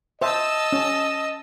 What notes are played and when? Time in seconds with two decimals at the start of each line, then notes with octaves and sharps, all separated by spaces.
0.21 C5 D#5 E5 A5 E6
0.72 C#4